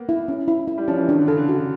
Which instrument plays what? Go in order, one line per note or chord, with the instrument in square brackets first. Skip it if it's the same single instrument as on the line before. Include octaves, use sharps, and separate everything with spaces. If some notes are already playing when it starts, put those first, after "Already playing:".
Already playing: [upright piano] A#3 B3
[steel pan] E4
C#4
E4
E4
[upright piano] G3
[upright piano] F3 [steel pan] C#4
[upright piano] E3
[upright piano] D#3 [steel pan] D4
[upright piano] D3
[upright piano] C#3 [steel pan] A4
[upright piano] D3
[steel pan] F#4